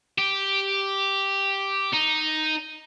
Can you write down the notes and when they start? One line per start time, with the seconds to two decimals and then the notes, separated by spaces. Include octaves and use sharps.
0.18 G4
1.94 D#4